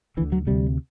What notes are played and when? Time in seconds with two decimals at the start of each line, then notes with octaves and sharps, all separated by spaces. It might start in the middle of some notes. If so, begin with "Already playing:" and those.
0.17 D3 E3
0.21 D2
0.32 F#3
0.47 D2 C3 G3